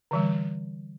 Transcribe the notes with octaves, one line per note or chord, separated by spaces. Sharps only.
D3 E3 G3